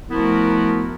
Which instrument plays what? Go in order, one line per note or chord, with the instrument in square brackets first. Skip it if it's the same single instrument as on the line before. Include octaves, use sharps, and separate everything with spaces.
[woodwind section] F3 A3 B3 E4 F#4 A#4